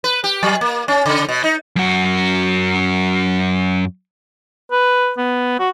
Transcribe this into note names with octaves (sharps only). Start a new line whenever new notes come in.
B4
G4
F#3
A#3
C#4
C#3
B2
D#4
F#2 F#4
B4
B3
F#4